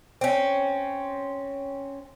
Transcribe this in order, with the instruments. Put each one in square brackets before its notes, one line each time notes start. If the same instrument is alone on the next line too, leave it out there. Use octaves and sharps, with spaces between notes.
[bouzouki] C4 C#4